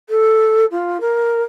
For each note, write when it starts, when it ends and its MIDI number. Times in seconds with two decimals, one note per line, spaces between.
0.09 0.65 69
0.71 0.97 65
1.01 1.42 70